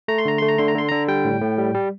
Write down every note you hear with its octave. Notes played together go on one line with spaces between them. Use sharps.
A3 A#5
C6
D3 A#5
A3 C6
A#5
D3 C6
A#5
D3 C6
D3 A#5
G3 G5
A2
A2
G3
G3